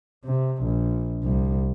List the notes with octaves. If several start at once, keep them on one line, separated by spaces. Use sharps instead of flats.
C3
A#1
C2